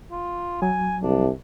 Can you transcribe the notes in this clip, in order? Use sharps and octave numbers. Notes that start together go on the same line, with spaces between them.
F4
F#3 G#5
C2 D4